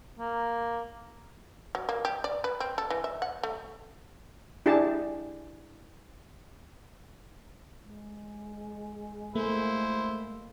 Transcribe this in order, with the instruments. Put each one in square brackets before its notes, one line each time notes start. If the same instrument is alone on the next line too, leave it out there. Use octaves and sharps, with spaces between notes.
[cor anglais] A#3
[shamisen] F#3
A#3
G4
D5
B4
C4
A4
E3
E5
F#5
A3
[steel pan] D4 E4 G4 G#4 A5
[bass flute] G#3
[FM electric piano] A3 [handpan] A#3 [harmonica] E4 C5